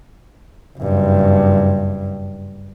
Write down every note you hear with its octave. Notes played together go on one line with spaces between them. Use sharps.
F#1 G2